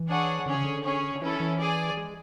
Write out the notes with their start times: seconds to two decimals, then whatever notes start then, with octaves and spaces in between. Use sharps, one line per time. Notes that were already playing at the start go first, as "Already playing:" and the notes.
Already playing: E3
0.09 D4 G#4 C#5 F#5
0.46 D3 C#4 G#4 C#5
0.55 C#3
0.64 D3
0.84 C#4 G#4 C#5
1.15 D3
1.22 E3 C#4 E4 A4
1.40 E3
1.59 G#4 D5 G#5
1.97 G#3